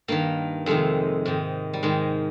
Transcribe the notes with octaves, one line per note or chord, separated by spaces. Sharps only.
G2 D#3 A#3
F2 C3 D#3 G#3
G#2 D#3
G3
G#2 D#3 G#3